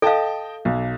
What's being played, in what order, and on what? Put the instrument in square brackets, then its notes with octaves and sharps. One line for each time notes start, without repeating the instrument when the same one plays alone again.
[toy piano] A4 F5 [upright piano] D#5 G5 A5
[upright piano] B1